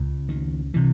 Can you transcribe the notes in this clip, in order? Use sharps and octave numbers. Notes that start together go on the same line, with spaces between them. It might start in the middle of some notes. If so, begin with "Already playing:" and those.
Already playing: C#2 C#3
D#3
C3 E3